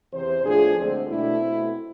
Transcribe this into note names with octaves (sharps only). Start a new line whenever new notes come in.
E2 C3 E3 C5
A2 F3 B3 D4 G#4
D2 D3 G#3 C4
B2 A3 D4 E4
B2 A3 C4